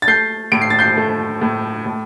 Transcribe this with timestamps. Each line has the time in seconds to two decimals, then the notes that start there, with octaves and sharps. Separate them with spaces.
0.02 A6
0.07 A3 G6 C7
0.52 A2 D7
0.61 C7
0.70 A6
0.79 G6 C7
0.97 A3
1.42 A2
1.86 A2